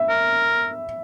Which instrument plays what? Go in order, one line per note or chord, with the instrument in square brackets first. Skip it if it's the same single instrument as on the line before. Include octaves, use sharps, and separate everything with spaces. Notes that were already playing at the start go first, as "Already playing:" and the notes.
Already playing: [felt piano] E5
[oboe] A#4